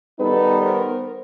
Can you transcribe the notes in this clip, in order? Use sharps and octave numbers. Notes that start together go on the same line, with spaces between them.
D#3 G3 B3 D#4 A4 B4
A#4 C5